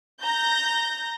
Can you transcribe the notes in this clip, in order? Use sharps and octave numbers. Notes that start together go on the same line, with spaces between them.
A#5 G6 A#6